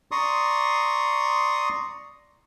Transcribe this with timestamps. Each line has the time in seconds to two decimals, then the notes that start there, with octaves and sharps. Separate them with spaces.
0.11 D5 A#5 C6 C#6 D#6